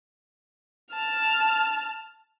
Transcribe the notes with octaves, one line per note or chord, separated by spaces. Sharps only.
A5 F6